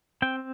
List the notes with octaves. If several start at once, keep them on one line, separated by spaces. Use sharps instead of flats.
C4 G5